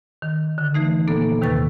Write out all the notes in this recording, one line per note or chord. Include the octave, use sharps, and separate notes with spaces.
D#3
D3
E3 A3 D#4
A#2 A#3 B3 A4
D#2 C3 D#3 B4 C#6 A6